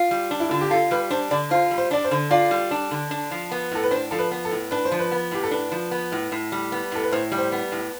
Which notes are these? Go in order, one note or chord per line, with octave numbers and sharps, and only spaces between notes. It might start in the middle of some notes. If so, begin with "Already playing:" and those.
Already playing: F4
G3
D4
E4
D3 F4
G4
F4 A4
G3 B4
D4 C5
D3 D5
F4 C5
G3
C5
D4 D5
C5
D3
F4 D5
G3
D4
D3
D4
F3
B3
A2 A4
B4
D4 C5
F3 A4
B4
B3
A4
A2
D4 B4
C5
F3
B4
B3
A2 G4
A4
D4 B4
F3
B3
A2
A2
G3
B3
A2 A4
B4
A2 C5
G3
C5
B3
A2